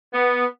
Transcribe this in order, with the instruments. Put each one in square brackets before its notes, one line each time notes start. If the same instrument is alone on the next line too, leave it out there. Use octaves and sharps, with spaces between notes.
[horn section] B3